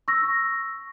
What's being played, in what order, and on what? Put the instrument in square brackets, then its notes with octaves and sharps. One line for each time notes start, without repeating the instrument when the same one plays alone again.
[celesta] C#6 E6 A#6